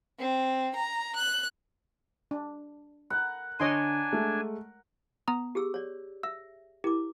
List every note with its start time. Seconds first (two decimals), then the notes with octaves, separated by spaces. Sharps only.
0.20 C4
0.76 A#5
1.16 F#6
2.31 D4
3.10 A#4 F#5 B5
3.60 D3 D4 C#5 D#5 G#5 C6 D7
4.13 G#3 A3
5.28 B3 A#5 D#6
5.55 G4 G#4 E6
5.74 C#5 D5
6.23 E5 E6
6.84 E4 G4 A#4 D6